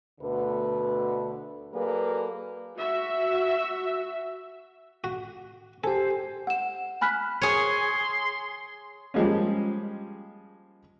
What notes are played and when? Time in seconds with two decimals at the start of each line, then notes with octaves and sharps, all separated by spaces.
0.21 D2 B2 D3 A3 B4
1.74 F#3 A#3 G#4 A4 B4 D5
2.77 F#4 E5
5.04 F#4
5.84 G4 A4 C5 G#5
6.47 F#5 E7
7.01 G#5 B5 F6 F#6 B6
7.42 G#4 C#5 C6
9.14 F3 G3 G#3 A#3 C#4